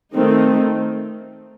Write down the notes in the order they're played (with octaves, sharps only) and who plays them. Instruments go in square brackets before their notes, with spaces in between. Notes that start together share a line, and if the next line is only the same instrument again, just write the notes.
[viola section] D#3 A3 C4 D#4